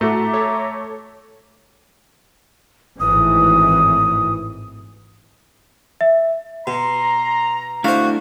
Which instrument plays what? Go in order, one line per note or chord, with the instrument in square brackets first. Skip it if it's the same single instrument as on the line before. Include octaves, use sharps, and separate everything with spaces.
[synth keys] A2 F#4 A4 [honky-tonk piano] A3 [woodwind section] E5 A#5 D6
[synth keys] A4 C#5
[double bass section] G#1 A2 E3 [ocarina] D#6
[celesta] E5
[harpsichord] B2 [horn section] A#5 [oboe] C6
[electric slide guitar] A3 D4 E4 [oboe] F#4 [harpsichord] C5 F5